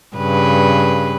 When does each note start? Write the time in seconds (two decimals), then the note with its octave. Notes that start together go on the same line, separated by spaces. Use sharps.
0.17 G2 C#3 B4